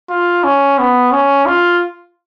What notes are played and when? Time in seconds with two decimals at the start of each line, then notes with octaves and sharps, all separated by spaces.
0.10 F4
0.44 C#4
0.79 B3
1.12 C#4
1.46 F4